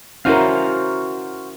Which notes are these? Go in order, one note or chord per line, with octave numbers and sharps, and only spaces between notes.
C#4 E4 F#4 A#4 C5 F5